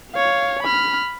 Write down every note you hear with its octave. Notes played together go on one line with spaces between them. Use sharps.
C#5 F5
B5 F6